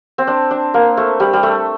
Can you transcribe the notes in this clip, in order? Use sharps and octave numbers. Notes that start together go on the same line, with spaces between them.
C4
D4
D4
A#3
A3
G3
G3
A3